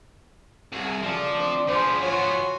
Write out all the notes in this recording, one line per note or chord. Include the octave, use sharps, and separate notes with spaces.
C2 F#4 G#4 G#5
C#3 F3 A4 D5
A3 C4 D4
F3 B3 D4 G#4 C5
F4 F#4 C#5 G#5